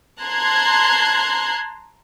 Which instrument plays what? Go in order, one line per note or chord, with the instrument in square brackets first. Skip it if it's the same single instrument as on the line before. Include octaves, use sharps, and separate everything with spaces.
[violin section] A5 A#5 C6 F#6 G#6